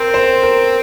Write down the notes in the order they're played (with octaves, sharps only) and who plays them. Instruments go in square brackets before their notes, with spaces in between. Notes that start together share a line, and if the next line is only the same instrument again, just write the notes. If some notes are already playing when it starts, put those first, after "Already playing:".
Already playing: [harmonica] C4 [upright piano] A#4
[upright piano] C5
A#4